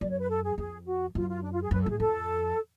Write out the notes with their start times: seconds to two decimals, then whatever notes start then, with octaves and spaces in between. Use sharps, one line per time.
0.01 F#2 D5
0.10 C#5
0.20 B4
0.29 A4
0.44 G#4
0.58 F2 G#4
0.86 F#4
1.15 F#2 F4
1.29 F4
1.43 D4
1.52 F4
1.62 G#4
1.71 F#2 B4
1.81 A4
1.86 A2 G#4
1.99 F2 A4